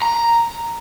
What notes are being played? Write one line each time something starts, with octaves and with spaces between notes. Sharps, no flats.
A#5